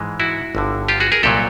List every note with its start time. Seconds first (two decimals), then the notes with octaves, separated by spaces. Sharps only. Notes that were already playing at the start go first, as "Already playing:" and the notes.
Already playing: G#2 E3 G#3
0.20 E4 F#4
0.55 G1 G2 D3
0.89 F4 G4
1.00 F#4 G#4
1.12 G#4 A#4
1.23 C2 A#2 F#3 G4 A4